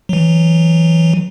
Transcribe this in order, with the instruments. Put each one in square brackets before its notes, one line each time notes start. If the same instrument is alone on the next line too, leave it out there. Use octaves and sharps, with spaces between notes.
[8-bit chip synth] E3 F#3